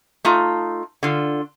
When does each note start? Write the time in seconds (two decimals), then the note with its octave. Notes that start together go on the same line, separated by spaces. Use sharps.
0.25 A3 D#4 F4
1.03 D3 F4